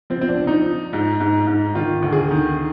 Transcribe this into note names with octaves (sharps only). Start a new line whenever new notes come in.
F3 C4
C4
D4
F3
D#4
F3
G#2
G#2
G#2
D#3 F4
D2
G#4
D#3